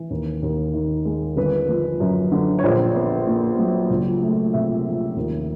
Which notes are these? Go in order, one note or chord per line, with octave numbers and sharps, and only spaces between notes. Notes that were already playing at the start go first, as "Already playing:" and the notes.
Already playing: E3
D#2
D#2
D#3
G#3
G1 B4
F3
F#2
D3
C#5
A#1 C5
B3
A#2
F#3
C#2
A3
C3 E5
F3
D#2